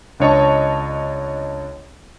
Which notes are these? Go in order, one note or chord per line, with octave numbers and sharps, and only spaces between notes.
C#2 D4 C#5 D#5 A5 C#6